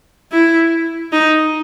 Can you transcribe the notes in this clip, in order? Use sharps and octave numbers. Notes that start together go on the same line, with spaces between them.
E4
D#4